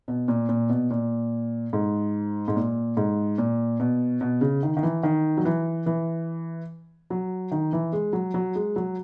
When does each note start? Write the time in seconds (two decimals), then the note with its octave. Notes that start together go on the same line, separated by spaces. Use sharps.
0.08 B2
0.28 A#2
0.49 A#2
0.69 B2
0.91 A#2
1.73 G#2
2.48 G#2
2.56 A#2
2.97 G#2
3.38 A#2
3.80 B2
4.21 B2
4.41 C#3
4.63 D#3
4.77 D#3
4.83 E3
5.03 D#3
5.37 F#3
5.45 E3
5.86 E3
7.10 F#3
7.51 D#3
7.73 E3
7.93 G#3
8.13 F#3
8.34 F#3
8.55 G#3
8.76 F#3